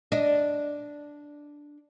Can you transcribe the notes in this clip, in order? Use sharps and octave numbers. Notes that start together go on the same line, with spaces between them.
D4 D#5